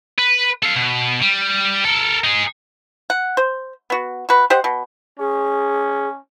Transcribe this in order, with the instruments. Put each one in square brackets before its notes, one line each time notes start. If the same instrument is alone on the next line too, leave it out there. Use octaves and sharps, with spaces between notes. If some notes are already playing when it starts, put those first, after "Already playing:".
[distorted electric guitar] B4
A4 F5
B2
G3
A4 A#4
D#4 G#4
[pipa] F#5
C5
B3 F#4
F#4 B4
G4 C5 D#5 F#5
B2
[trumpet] C#4 [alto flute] G#4